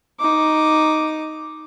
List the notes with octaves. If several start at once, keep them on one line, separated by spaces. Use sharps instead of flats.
D#4 D6